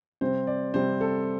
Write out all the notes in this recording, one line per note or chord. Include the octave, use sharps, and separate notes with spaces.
C3 G3 C4 C5
D5
C3 G3 C4 C5
A4